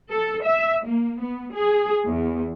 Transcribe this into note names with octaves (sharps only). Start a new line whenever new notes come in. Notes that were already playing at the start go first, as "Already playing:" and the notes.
A4
E5
A#3
B3
G#4
E2